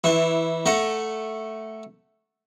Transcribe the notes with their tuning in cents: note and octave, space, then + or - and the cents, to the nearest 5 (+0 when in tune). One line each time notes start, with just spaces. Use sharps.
E3 +0 E4 -15 C#6 -35
A3 +0 F#5 +0 A#5 +20